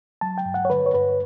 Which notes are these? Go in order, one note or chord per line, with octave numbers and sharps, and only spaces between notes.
F#3 A5
G5
G2
F#5
C#5
D3 B4
C#5
G2 B4